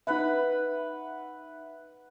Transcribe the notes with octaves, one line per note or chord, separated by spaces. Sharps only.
D#4 B4 E5 F#5 B5